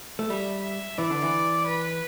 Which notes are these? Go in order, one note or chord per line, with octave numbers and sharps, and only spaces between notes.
A3
G3 E5
E5
E3 D5
D3
E3
B4